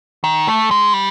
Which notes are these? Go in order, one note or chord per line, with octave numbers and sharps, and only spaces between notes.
D#3
A3
G#3
G3